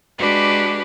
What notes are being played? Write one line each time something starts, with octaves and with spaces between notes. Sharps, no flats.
G#3 D4 F#4 G4 B4